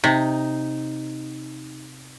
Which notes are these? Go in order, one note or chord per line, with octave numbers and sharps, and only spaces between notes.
C3 D#4